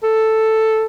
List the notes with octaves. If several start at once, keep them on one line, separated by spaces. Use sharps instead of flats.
A4